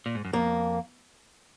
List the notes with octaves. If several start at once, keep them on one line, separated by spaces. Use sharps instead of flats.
A#2
G#2
F#2
F2 A#3